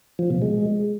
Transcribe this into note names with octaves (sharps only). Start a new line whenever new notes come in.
F3
B2
G#3